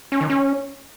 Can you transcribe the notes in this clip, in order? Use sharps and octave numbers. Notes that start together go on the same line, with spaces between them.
C#4
D#3
C#4